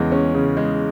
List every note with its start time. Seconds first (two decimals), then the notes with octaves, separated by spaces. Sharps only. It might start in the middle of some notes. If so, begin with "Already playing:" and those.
Already playing: E2 C#3 G#3
0.12 C#4
0.34 C#3
0.57 G#3